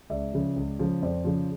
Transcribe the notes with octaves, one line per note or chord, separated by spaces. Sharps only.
C#2 D5 E5
C#3 F3
C#2
C#3 F3
F2 C5 D5
C#3 F3